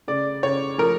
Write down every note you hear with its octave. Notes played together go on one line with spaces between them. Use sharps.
C#3 D5
C#3 C#5
F3 A#4